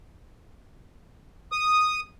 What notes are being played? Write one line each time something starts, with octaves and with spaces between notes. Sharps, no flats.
D#6